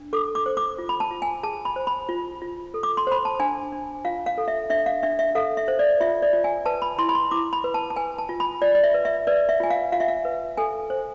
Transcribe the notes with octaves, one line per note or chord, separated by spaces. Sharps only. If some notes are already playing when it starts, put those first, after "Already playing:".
Already playing: D4
A4 D6
D6
C5
D6
F4
B5
A5
F4
G#5
G#4 A5
B5
C5
B5
F4
F4
A4
D6
C6
C5 B5
A5
D4 G#5
D4
F4 F5
F5
A4
E5
D4 E5
F5
D4 E5
E5
A4 F5
E5
C5
D5
F4 E5
D5
F4
G#5
B4 A5
B5
E4 C6
B5
C6
E4 D6
B5
B4
A5
A5
B4 G#5
A5
F4
B5
F4 D5
D5
E5
B4
E5
B4 D5
E5
F4 G#5
F5
F4 F5
E5
F5
B4
A4 G#5
C5